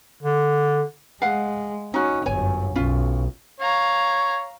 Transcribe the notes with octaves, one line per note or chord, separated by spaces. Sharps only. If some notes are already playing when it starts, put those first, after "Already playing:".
D3
G#3 F5 F#5
C#4 D#4 F#4
G1 F#2 C#5 G#5
B1 C#4 F4
C#5 F5 A#5